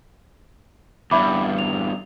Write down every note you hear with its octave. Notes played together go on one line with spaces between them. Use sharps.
E2 G2 E5 B5 D6
F7